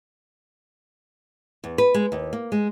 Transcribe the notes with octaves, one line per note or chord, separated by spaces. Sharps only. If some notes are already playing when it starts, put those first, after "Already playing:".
E2
B4
G#3
D#2
A#3
G#3